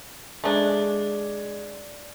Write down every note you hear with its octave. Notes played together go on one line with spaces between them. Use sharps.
G#3 A3 D4